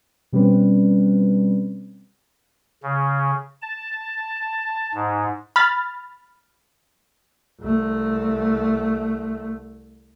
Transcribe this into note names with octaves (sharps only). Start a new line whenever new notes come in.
B2 G3 C4 C#4 B4
C#3
A5
G#2
B5 F6 A6
C2 A3